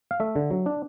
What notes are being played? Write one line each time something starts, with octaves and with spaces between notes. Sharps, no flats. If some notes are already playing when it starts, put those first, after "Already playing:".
F5
A3 E5
D3
F#3
D4